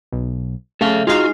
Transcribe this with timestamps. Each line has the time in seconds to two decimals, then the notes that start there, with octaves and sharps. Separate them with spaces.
0.12 B1
0.81 C#3 A3 A4 F5
1.07 G#3 D#4 F4 F#4 F5